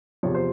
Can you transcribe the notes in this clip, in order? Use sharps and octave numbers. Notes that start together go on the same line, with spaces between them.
E2 C3 F3 C#5
C5